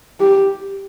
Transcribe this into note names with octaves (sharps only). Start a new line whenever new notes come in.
G4